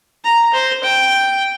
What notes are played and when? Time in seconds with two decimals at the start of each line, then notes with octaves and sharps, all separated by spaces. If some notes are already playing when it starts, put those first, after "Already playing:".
0.25 A#5
0.54 C5
0.84 G5